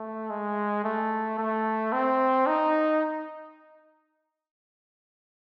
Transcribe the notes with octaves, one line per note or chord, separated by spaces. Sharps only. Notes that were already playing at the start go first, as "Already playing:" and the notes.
Already playing: A3
G#3
A3
A3
C4
D#4